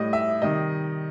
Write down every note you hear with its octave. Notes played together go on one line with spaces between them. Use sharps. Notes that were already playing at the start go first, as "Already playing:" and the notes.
Already playing: A2 G3 D#5
E5
C3 D#3 G3 D#5